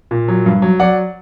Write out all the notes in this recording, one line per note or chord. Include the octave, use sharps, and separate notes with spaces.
A#2
F#3
G2
F#3
F#3 D5 F#5